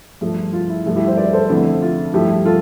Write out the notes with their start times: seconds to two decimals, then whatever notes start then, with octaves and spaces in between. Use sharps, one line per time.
0.21 G2 F3 A3
0.53 F4
0.69 E4
0.86 G2 F3 A3
0.96 E4 G4
1.06 C5 E5
1.17 B4 D5
1.33 A4 C5
1.49 F2 D3 A3 E4
1.82 F4
2.14 G2 F3 A3 E4 G4
2.45 F4 A4